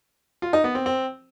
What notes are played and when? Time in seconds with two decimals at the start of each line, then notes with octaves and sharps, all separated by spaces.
0.42 F4
0.53 D#4
0.64 B3
0.75 C4
0.86 C4